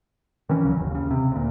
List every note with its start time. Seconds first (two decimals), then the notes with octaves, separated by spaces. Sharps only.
0.49 D#3 E3 C#4
0.64 C#2 C#3 F#3
0.77 G1 D#2
0.91 D#2 C#3
1.11 C3
1.32 D2 A#2